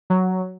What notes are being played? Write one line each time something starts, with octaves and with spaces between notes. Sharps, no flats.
F#3